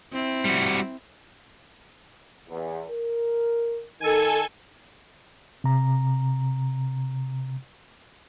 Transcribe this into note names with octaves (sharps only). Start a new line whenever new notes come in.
C4 E4
G3 F#4
E2
A#4
D#3 A4 G#5
C3 A#5